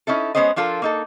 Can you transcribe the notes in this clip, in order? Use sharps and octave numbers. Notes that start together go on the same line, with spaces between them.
C#4 D#4 E4 A4
G#3 A3 B3 C#4 C5 D#5
F3 D4 F4 A4 A#4
A#3 D#4 A4